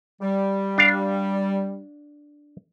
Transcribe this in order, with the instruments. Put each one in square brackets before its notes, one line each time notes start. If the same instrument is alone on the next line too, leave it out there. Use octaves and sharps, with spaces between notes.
[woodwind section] G3
[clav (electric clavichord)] D4 F5